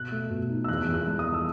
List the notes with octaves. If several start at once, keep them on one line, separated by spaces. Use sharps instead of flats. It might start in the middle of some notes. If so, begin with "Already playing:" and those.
Already playing: B2 F#6
A3
B2
D#4
E6
E2 F#6
E2
F#6
G#3
D#6
E2
E6